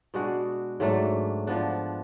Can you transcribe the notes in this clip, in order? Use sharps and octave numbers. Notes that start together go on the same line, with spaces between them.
B2 G#3 D4 F#4
G#2 F#3 A3 D4
F3 B3 D4